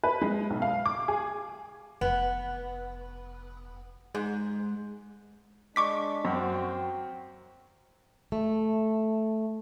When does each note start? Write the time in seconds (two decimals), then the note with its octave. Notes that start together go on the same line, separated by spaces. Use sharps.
0.04 B4
0.21 G#3
0.50 B1
0.62 F5
0.86 D6
1.08 G#4
2.01 F1 B3
4.15 G#2 G#3
5.76 G#3 D4 C#6 D6 B6
6.25 F#2 C4 F#4
8.32 A3